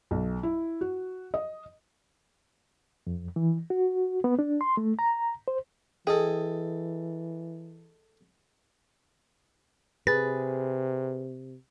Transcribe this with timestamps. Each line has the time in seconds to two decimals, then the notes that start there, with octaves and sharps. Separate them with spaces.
0.11 B1
0.43 E4
0.81 F#4
1.34 D#5
3.07 F2
3.36 E3
3.70 F#4
4.24 B3
4.39 D4
4.61 C6
4.77 A3
4.99 A#5
5.48 C5
6.07 E3 G#4 A4 D#5 G5
10.07 C3 G#4 B4 A6